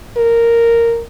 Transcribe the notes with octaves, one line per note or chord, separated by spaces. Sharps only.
A#4